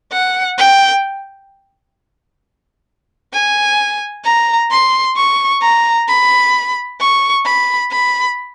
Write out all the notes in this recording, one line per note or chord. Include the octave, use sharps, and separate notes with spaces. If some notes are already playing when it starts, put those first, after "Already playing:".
F#5
G5
G#5
A#5
C6
C#6
A#5
B5
C#6
B5
B5